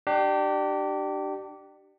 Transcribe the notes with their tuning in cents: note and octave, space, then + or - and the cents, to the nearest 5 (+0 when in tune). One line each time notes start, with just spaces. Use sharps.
D4 +25 G4 -20